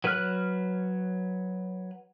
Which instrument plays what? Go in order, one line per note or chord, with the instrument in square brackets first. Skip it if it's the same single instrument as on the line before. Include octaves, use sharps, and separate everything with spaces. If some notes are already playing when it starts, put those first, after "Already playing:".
[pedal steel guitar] F#3 B4 C#5 F6 F#6